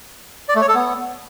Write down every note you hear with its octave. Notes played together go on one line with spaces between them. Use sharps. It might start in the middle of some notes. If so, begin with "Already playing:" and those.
D5
A3
C#5
A4
B3